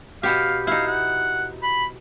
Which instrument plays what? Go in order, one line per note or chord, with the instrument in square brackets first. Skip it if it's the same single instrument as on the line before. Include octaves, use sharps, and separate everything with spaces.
[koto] B2 B3 G4 [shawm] F5
[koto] D#4 E4 [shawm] F5
[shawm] F#5
B5